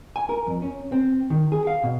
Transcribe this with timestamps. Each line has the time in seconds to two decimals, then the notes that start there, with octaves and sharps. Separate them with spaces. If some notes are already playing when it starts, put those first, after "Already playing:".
0.16 G#5
0.29 A#4
0.47 F2
0.62 C#4
0.92 C4
1.30 D#3
1.52 G#4
1.67 F5
1.83 B2